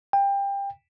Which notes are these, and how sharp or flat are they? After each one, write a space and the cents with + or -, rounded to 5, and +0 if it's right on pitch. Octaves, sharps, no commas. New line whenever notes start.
G5 +25